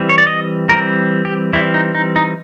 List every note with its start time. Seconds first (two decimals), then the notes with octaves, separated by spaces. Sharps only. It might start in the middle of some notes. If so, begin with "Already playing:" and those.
Already playing: E3 G3 C4
0.09 C#5
0.18 D5
0.27 D#5
0.69 E3 G3 C4 A#4
1.25 G4
1.53 E3 G3 C4 E4
1.74 D#4
1.95 D#4
2.16 D#4